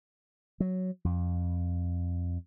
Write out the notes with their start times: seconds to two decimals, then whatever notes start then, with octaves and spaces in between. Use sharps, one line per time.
0.60 F#3
1.05 F2